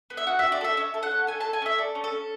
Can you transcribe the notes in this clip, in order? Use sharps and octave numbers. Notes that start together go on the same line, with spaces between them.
B3
E5
F#4 F#5
E5
F#4
D5
A4 E5
C#4 E5
A4
F#5
C#4
A4 G#5
A5
A4
G#5
C#4 E5
A4 D5
C#4
A4
C#4